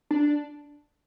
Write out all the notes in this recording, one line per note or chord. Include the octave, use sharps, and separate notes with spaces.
D4